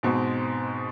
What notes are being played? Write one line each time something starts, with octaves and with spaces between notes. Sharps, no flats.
G#2 B2 C4